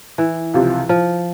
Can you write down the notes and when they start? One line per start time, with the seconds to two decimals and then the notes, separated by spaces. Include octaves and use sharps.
0.18 E3
0.54 C#2 C3 F3
0.89 F3